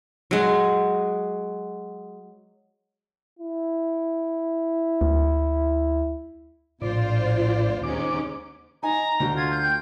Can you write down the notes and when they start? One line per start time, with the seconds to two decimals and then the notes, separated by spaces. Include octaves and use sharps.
0.31 F#3 G#3
3.39 E4
5.01 D2
6.82 A#1 A2 F4 C5 D5
7.83 D#2 G#2 C#4 D6
8.83 D#4 G#5 A#5
9.20 D2 F#4
9.37 F4 G#6
9.51 G6
9.64 G5